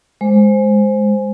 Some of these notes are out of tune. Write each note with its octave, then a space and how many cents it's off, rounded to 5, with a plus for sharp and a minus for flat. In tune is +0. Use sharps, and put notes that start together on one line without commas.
G#3 +0 C5 +0